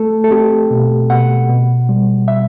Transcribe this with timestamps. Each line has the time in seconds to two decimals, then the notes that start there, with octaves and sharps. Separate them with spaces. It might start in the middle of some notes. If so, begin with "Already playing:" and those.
Already playing: A3 A4
0.24 A4
0.31 C4 G4
0.71 B2
1.09 B2 F#5
1.49 B2
1.89 G3
2.28 E5